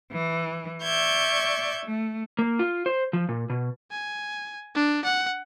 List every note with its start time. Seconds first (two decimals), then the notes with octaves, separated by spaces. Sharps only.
0.11 E3
0.83 D5 E5 C#6 G6 G#6
1.86 A3
2.39 A#3
2.59 F4
2.86 C5
3.13 F3
3.29 A#2
3.50 B2
3.91 G#5
4.75 D4
5.04 F#5